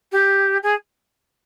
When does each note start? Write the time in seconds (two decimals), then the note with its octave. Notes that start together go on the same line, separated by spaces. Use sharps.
0.12 G4
0.63 G#4